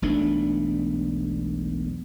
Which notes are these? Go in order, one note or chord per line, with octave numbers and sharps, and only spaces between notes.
E1 B1 A3 D4